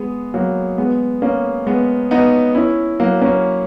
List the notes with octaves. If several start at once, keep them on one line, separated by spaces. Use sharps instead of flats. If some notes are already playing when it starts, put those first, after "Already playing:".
Already playing: G#3 B3
F#3 A#3
G#3 B3
A#3 C#4
G#3 B3
B3 D#4
C#4 E4
F#3 A#3
A#3 C#4